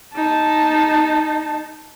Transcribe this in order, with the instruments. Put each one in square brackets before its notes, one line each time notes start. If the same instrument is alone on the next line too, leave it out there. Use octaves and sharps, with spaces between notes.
[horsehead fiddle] D#4 A5